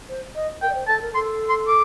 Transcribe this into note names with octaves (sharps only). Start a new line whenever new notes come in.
C5
D#5
A#4 G5
D5
C5
A4 A5
A#4
A4 C6
C6
D6